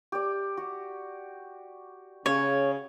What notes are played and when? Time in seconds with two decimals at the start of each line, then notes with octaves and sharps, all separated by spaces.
0.12 G4 D5
0.57 F#4 G4
2.26 C#3 C#5